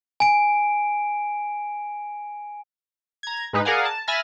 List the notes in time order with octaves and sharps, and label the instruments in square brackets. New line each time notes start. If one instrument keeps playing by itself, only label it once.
[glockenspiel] G#5 D7
[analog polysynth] A#5 G#6
G#2 G#3 D#4 B4
G#4 A#4 D5 F5 F#5 G#5
A5
E5 G#5 B5 F6 A6 A#6